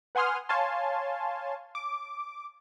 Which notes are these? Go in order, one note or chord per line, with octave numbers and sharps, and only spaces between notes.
B4 F#5 G#5 C6 D#6 F6
C#5 F5 G#5 A5 C6
D6